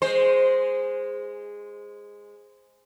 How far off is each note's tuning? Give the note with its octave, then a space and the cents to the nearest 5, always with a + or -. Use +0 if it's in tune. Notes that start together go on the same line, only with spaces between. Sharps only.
G#3 -10 C5 +0